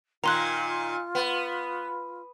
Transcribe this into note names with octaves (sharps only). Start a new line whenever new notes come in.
A#2 D#3 F4 A#5 C6 F#6
B3